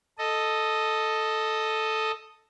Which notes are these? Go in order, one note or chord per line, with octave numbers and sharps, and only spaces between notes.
A4 D#5